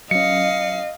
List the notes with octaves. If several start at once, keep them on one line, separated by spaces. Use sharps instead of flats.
F#3 C#4 D#5 F5 C#7